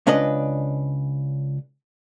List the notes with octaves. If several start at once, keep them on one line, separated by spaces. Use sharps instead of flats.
C#2 C#4 D4 B4 D#5